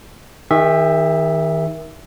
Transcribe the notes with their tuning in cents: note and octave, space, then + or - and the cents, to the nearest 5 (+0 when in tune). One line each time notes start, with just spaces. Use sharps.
D#3 +25 G#4 -40 E5 +0